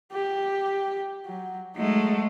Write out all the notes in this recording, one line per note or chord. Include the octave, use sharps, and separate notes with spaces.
G4
F#3
F#3 G#3 A3 D#4